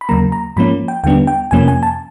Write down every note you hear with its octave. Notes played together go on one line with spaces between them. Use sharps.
B5
D#2 C#3 F#3 A#3 A#5
A#5
G#2 F3 A#3 C#4 B5
G5
D#2 D3 G3 B3 D4 G5
G5
F2 C3 F3 A#3 C#4 G#5
G#5
A5